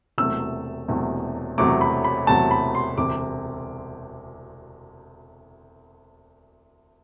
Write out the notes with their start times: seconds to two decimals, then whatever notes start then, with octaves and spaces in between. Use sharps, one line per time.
0.18 E1 E2 C3 F#3 A3 E6
0.88 E1 E2 C3 F#3 A3
1.58 E1 E2 C3 F#3 A3 D6
1.81 B5
2.04 B5
2.27 E1 E2 C3 F#3 A3 A5
2.51 B5
2.75 C6
2.97 E1 D2 C3 D6